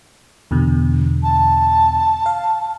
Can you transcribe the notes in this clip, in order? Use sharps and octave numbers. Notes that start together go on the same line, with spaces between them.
E2 B2 D3
A5
F5